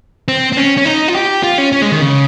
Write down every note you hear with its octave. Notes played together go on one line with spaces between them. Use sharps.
C4
C4
C#4
C#4
D#4
F4
G4
F4
C#4
C#4
G#3
D#3
C#3